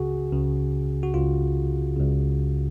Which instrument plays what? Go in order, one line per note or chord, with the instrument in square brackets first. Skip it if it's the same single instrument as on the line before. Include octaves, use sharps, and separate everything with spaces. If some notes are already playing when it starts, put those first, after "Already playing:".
Already playing: [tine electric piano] C#2 C#3 F#4 G#4
C#2 C#3
F#4
C#2 C#3 F4
C#2 C#3